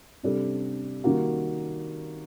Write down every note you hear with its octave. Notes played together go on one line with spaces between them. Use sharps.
C3 G3 D4 A4
D#3 G3 A#3 F#4 A#4